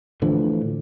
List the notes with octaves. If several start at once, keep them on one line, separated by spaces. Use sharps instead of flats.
A2 D3 E3 F3